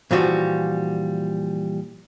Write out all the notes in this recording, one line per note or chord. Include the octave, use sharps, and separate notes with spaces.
A#2 E3 F3 G3 F#4